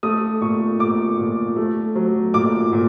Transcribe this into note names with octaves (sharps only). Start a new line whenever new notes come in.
A3 D#6
A#2 C#6
A#2 D6
A#2
A3
F#3
A#2 D6
A#2